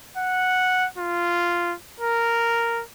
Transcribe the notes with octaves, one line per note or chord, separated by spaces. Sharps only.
F#5
F4
A#4